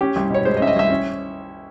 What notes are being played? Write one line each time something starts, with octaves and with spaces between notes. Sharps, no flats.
C#4 G4
C2
B2 C#5
G#3 C5
D#5
C#4 E5
D#5
C2 E5
C#4